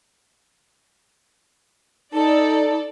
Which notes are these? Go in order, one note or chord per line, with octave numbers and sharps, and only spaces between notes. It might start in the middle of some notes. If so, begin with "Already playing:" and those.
D#4 A4 D5